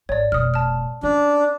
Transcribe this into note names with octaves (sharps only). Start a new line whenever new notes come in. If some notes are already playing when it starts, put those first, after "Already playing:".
G#1 C#5 D5
F1 B2 D#6 F6
A5 F6
C#4 D4